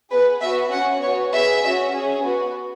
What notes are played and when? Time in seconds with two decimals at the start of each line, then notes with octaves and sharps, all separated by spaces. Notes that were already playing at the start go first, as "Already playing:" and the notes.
0.11 B3 G#4 B4
0.42 B3 F#4 E5
0.72 C#4 F#4 F#5
1.02 B3 F#4 C#5
1.33 B3 G#4 E5
1.63 C#4 F#4
1.93 C#4 G#4
2.23 B3 F#4